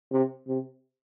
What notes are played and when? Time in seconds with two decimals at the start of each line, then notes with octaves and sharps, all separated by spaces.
0.12 C3
0.48 C3